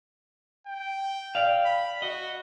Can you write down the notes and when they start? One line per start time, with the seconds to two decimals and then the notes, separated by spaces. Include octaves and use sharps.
0.67 G5
1.35 D5 F5
1.65 B5
2.02 F#4 D#5